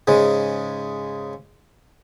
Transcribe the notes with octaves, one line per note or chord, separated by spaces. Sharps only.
G#2 C#3 G#3